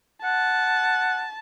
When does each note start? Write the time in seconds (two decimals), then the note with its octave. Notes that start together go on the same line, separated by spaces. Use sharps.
0.24 F#5 A5